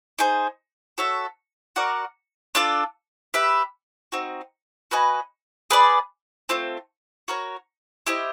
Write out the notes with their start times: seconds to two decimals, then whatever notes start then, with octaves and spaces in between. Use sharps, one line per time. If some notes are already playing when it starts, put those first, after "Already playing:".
0.19 D#4 G#4 C5
0.98 F#4 A4 C#5 E5
1.76 F#4 A#4 D5 F#5
2.55 D4 F4 A4 D5
3.34 G4 B4 E5
4.12 C4 D#4 F#4
4.91 F#4 B4 D#5 G#5
5.70 G#4 B4 D5
6.49 A3 C4 F4
7.28 F#4 A#4 C#5
8.07 E4 G4 C5 D#5